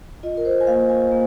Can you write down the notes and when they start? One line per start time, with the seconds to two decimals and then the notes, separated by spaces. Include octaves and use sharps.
0.23 F4 D#5
0.37 A#4
0.45 C5
0.61 G#5
0.67 A#3 F5
0.89 G#5
1.12 A#3